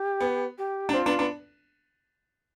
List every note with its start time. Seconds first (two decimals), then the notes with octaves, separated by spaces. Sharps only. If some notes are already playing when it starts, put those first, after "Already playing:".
Already playing: G4
0.21 B3
0.58 G4
0.89 D4
0.94 C4 F4
1.06 B3 D4
1.19 B3 D4